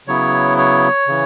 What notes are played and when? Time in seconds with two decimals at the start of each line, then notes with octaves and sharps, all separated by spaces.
0.07 C#3 F#3 B3 E4 C#5
0.58 C#5
1.08 C#3 E3